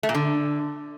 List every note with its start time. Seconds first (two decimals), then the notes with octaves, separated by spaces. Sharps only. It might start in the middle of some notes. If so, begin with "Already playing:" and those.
0.03 A3
0.09 A#2
0.14 D3